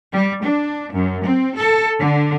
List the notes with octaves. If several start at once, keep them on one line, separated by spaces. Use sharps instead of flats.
G3
D4
F#2
C4
A4
D3